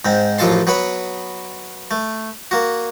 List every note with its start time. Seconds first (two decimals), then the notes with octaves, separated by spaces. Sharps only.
0.05 G#2 C4
0.38 A1 F#2 F3 A4 A5 C6
0.67 F#3 B3 C#5 F#5 B5
1.91 A3
2.51 A#3 F#4